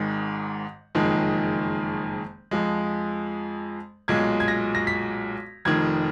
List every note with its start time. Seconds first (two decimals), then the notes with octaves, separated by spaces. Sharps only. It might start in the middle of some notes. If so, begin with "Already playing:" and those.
Already playing: G#1 G#2 D#3 G#3
0.95 F#1 F2 D#3 G#3
2.51 F2 F3 G#3
4.08 B1 A#2 G#3 G#6
4.40 G#6
4.48 A#6
4.75 A#6
4.87 B6
5.65 F1 F2 D#3 G#6